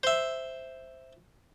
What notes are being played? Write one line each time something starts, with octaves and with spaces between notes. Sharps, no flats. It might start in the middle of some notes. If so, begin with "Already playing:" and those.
C5 E5